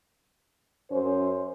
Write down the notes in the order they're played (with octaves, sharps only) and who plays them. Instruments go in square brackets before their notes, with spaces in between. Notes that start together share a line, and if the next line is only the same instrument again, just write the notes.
[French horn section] F#2 C#4 C5